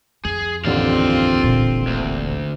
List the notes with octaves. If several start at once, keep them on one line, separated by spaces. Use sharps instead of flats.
F2 G#4
A1 D#2 D3 C4 F4 D5 F5
D#1 A#2
D2